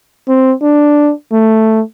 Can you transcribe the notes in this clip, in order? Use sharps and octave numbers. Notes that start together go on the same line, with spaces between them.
C4
D4
A3